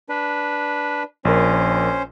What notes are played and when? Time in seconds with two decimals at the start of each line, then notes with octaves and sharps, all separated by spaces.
0.09 D4 B4
1.25 A#1 C#4 A#4 C5